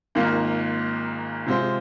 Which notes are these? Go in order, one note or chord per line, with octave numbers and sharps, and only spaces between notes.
G#1 G#2 D#3 A#3 F4
C3 G#3 F4 C5